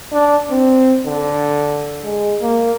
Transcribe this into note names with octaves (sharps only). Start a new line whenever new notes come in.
D4
C4
D3
G#3
A#3